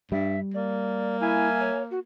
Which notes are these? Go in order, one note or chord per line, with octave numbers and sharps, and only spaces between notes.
G2 G3 E5
A#3 D5
E4 E5 F5 G#5
C#5
F#4